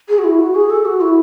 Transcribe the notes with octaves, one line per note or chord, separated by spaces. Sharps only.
G#4
F#4
E4
F#4
G#4
A4
F#4
E4